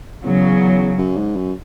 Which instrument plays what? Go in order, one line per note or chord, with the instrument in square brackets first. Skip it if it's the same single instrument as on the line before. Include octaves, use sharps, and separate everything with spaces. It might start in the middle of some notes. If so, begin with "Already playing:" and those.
[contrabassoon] E2 [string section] C#3 F#3
[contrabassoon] F#2
G#2
F#2